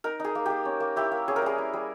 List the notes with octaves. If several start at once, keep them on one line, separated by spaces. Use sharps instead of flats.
D#4 A#4
D#4 G#4
A#3
A#3 G4
C#4
A#3
E4 G4
A#3
C#4 G#4
A#4
G3 G#4
E4
G3